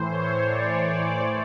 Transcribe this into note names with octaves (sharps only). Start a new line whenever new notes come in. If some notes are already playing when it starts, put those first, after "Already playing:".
Already playing: A2 E3 C5
C#5
D5